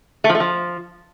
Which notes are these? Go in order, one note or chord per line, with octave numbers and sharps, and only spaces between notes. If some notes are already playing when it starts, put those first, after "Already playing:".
A3
F3
A3
F3